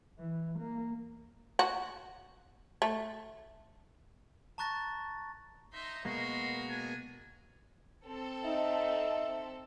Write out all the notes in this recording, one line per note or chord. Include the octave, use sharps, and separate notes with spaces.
E3
A#3
F#4
A3
A5 A#5 C#6 F#6 A6 A#6
D#4 E5 C6
B2 G#3 A#3 F#4 A#4 D#5 C6
D4 G#5
C4 A4
D#4 E5